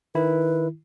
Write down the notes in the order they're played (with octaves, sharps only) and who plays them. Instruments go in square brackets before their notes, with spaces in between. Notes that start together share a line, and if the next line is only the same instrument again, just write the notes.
[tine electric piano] D#3 E4 [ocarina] B4